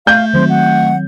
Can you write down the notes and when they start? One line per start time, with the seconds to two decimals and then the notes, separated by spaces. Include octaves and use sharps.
0.07 A3 F5 G6
0.34 D#3 F#3 C4 C5
0.49 F#5